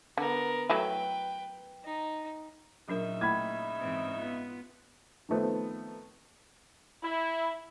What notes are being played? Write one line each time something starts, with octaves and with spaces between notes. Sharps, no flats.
D3 B3 A#4
F#3 A3 E4 B4 G5
D#4
A#2 C#3 F#3 D4 D#4 A#4 E5
A3 A#3 E4 B5 G#6
G#2 E3 C4
B3 F4
D#3 F3 A3 B3 C4
E4